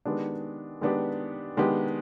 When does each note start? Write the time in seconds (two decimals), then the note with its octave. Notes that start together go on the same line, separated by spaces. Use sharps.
0.05 D#3 G#3 B3 D4 G4
0.81 D#3 G#3 B3 D4 G4
1.57 D#3 G#3 B3 D4 G4